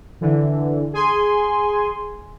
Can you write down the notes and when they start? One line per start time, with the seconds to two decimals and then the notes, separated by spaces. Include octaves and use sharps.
0.21 D3 E3
0.93 G#4 G#5 C6